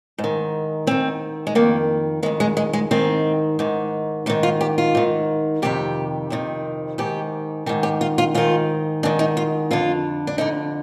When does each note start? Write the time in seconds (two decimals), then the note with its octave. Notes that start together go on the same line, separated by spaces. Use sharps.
0.18 G#2
0.24 D#3
0.87 G#2 D#3 C4
1.47 G#3
1.55 F2 D#3 A#3
2.23 D#3 G#3
2.26 F2
2.40 G#3
2.57 G#3
2.73 G#3
2.91 G#2 D#3 C4
3.59 G#2 D#3
4.26 G#2 D#4
4.30 D#3
4.43 F4
4.61 G4
4.78 F4
4.95 G#2 D#3
5.62 F2 C3 D#3 G4
6.30 F2 C3 D#3
6.98 G#2 D#3 G4
7.66 G#2 D#3 G4
7.83 G4
8.01 F4
8.18 F4
8.34 G#2 D#3 F4
9.03 G#2 D#3 D4
9.19 D#4
9.37 F4
9.71 F2 D3 F4
10.27 D4
10.38 F2 D3 D#4